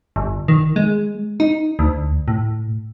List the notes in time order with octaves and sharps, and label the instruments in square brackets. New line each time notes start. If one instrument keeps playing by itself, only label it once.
[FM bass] G1
D#3
G#3
D#4
D2
A2